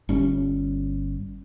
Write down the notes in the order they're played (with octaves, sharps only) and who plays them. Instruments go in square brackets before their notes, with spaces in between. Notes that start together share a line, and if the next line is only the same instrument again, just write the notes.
[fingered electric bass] G1 G3 C#4